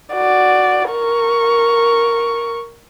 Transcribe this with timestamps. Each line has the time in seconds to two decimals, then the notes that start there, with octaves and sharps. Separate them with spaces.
0.14 F#4 D5
0.90 A#4 C#6